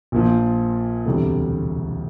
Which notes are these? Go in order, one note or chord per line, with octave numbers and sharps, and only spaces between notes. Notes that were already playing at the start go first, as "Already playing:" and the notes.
A#1 A#2 F3
E1 D2 C3 E3 G3